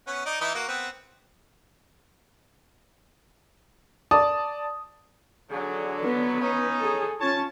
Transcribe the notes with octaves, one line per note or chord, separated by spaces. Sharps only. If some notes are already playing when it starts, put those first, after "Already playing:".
B3 C#4
D#4 D5
E3 D#4 E4
A#3 F#4
B3 C4
D5 A5 D#6
D3 F#3 G#4
B3 B4
C#4 D#4
G#4 A4
C#4 F4 C#5 A5